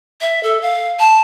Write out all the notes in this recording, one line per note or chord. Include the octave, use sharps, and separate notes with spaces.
E5
A4
F5
A5